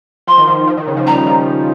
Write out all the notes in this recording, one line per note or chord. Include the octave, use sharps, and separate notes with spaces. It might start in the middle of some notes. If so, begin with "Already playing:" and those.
F3 C6
D#3
F3
F3
D#3
C#3
F3
G3 A#5
F3